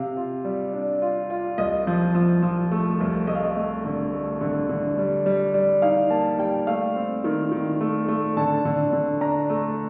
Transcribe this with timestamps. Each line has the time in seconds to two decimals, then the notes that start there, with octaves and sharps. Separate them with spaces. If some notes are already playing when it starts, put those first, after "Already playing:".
Already playing: C3 F5
0.17 F4
0.45 G3
0.73 D4
1.02 F4
1.30 F4
1.58 C2 D#5
1.87 F3
2.15 F3
2.42 F3
2.71 A3
3.00 C2
3.27 A3 D#5
3.35 F5
3.43 D#5
3.56 A3
3.85 D3
4.13 A3
4.41 D3
4.69 D3
4.98 G3
5.26 G3
5.54 G3
5.82 D#4 F5
6.10 A#3 A5
6.39 G3 G5
6.67 A3 F5
6.95 C4
7.24 D#3
7.52 D#3
7.81 A3
8.08 A3
8.37 D3 A5
8.65 D3
8.93 D3
9.21 D4 A#5
9.50 A3